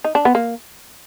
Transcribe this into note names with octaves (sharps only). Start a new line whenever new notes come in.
D#4
D4
B3
A#3